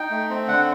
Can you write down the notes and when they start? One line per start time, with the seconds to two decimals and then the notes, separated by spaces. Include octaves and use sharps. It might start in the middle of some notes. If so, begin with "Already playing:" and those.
Already playing: D#4 G5
0.11 A3
0.30 C4
0.48 D3 F#5